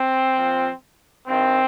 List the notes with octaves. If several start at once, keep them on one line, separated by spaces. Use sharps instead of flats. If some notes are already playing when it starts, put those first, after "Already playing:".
Already playing: C4
A#2 F3
G2 D#3 C4